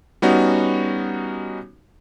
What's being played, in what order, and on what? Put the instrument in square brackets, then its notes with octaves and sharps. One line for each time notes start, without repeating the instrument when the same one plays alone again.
[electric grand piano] G3 B3 C#4 D#4 F#4